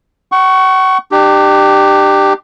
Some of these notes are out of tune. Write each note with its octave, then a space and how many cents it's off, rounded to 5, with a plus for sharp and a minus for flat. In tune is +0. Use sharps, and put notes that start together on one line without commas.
F#5 +40 C#6 +0
D4 +40 G4 +0